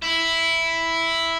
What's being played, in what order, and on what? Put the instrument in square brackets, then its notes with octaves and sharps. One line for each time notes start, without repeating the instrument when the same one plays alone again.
[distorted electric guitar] E4